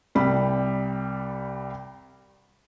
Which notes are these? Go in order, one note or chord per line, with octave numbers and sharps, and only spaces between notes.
C2 G3 B5